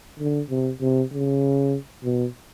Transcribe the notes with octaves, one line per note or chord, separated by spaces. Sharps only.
D3
C3
C3
C#3
B2